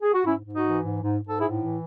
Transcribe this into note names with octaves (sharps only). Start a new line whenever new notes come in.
G#4
F#4
G#2 C#4 E4
G#2
D#4 F#4
E3
G#2
G#2
G#2
A4
A2 E4 G#4
E3